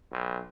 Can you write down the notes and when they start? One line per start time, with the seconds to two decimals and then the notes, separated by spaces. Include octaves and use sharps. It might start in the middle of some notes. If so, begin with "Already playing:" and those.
0.12 B1